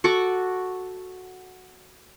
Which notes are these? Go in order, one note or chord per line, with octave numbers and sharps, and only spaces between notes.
F#4 A4 C#6 D6